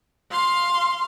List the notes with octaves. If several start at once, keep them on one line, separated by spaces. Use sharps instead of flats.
F5 C6